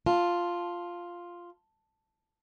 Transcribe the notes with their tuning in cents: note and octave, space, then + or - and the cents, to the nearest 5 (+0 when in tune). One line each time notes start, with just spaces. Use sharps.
F4 +0 A5 +0